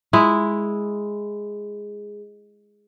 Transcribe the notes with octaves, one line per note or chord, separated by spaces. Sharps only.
G#3 E4